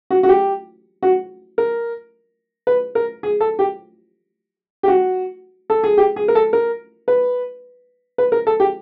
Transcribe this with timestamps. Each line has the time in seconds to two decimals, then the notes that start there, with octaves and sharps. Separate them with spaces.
0.11 F#4
0.23 F#4
0.29 G4
1.03 F#4
1.58 A#4
2.67 B4
2.95 A#4
3.23 G#4
3.41 A4
3.59 G4
4.83 G4
4.88 F#4
5.70 A4
5.84 G#4
5.98 G4
6.16 G#4
6.28 A#4
6.35 A4
6.53 A#4
7.08 B4
8.18 B4
8.32 A#4
8.47 A4
8.60 G4